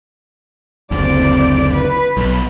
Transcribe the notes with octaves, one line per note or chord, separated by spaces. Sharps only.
F#1 D2 C4 D5
B4
B1